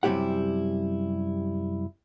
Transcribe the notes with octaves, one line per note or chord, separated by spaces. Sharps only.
F#2 C3 G3 E4 G4 F#5